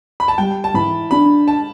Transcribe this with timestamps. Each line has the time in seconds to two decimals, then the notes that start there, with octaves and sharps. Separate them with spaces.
0.20 B5
0.28 A5
0.38 G3 G5
0.64 A5
0.74 E3 B5
1.11 D4 B5
1.48 A5